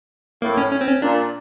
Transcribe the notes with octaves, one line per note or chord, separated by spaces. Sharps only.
A2 A#3
C#4
C#4
C4
C#4
A#2 D4